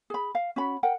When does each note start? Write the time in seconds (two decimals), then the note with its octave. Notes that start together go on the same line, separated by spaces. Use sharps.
0.10 G#4 B5
0.35 F5
0.56 C#4 F#4 B5
0.83 A#4 F#5 G5